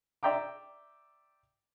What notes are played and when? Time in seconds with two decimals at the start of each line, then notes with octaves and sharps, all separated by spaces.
0.23 D5 E5 G5 A#5 D6